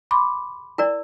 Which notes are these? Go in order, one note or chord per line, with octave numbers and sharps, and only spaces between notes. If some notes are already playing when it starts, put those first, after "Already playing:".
B5 C6 D6
E4 A#4 D5